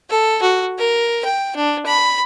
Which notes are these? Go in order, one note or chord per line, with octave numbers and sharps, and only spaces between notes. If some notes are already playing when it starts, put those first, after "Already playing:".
A4
F#4
A#4
G5
D4
B5